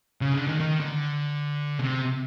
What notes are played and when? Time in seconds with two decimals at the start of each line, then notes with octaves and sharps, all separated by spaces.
0.21 C#3
0.34 D3
0.48 D#3
0.60 D#3
0.80 D3
1.79 C3